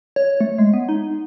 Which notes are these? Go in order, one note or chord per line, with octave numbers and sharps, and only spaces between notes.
C#5
A3
G#3
B3
D#4